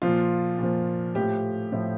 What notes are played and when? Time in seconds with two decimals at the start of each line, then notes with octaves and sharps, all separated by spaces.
0.02 A#2 F3 F4
0.58 A#2 F3
1.15 A2 F3 G4
1.72 A2 F3